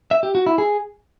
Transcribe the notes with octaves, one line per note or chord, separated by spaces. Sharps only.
E5
G4
F#4
E4
G#4